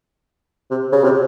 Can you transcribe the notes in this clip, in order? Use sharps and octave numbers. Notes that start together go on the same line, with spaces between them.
C3
C#3
C3